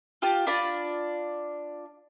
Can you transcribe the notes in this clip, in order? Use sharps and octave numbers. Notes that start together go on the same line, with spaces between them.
F4 G4 A5
D4 F4 D5 B5